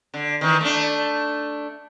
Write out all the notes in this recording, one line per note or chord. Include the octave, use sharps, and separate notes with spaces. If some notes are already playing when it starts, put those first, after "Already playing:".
D3
D#3 E3
A3 D4